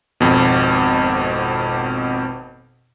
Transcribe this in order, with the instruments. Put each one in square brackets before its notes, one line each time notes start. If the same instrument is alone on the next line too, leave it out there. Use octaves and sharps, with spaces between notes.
[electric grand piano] G#1 F2 B2